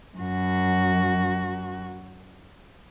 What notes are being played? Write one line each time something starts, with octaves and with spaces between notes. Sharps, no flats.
F#2 F#4